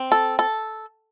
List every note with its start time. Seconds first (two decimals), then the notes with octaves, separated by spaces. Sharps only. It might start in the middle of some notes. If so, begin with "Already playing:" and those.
Already playing: C4
0.12 A4
0.39 A4